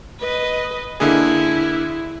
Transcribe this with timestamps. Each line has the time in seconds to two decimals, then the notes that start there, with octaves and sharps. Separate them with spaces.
0.20 B4 D#5
1.00 D3 A#3 E4 G#4